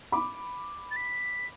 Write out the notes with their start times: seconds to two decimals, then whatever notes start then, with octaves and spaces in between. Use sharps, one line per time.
0.12 B5 D6
0.91 A6
0.96 B6